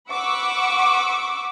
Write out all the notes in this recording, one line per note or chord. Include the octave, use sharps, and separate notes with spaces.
F#5 B5 C#6 D6 E6